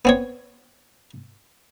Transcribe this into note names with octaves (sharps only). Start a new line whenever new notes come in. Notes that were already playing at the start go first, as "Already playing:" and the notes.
B3 C4 C#5